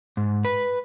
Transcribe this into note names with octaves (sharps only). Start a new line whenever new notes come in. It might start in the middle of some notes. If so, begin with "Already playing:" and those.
G#2
B4